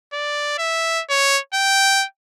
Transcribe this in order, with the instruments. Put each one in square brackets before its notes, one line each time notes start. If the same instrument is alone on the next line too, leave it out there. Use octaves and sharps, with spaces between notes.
[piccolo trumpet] D5
E5
C#5
G5